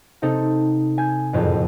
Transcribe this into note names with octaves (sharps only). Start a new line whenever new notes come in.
C3 C4 D#4 A4
G#5 G6
F#1 F2 A2